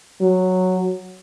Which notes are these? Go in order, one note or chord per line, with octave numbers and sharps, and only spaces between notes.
F#3